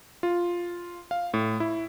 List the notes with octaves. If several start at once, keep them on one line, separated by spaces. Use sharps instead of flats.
F4
F5
A2
E4